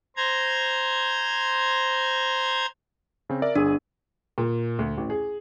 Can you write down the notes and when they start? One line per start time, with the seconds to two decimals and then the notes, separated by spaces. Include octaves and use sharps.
0.17 C5 A#5 G#6
3.29 C#3 C4
3.42 A#4 D5 E5
3.55 G1 D4 G#4 D#7
4.38 A#2
4.79 D2
4.97 A1
5.10 G#4